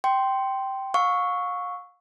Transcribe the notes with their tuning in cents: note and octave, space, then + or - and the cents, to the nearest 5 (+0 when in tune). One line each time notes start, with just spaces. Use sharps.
G5 -10 C6 +0
F5 +35 C#6 +0 E6 +0